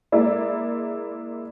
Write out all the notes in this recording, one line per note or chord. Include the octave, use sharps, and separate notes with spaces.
G#3 A#3 E4 D5